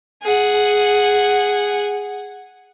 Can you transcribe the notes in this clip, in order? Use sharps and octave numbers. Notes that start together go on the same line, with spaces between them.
G#4 F#5